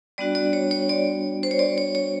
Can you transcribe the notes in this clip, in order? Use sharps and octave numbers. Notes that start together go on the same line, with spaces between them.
G3 B3 D4 F#4 D5
D5
C#5
C#5
D5
C5
C#5
D5
C#5
C#5